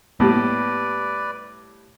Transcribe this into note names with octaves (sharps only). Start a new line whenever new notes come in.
A2 G3 A#3 B3 B4 D5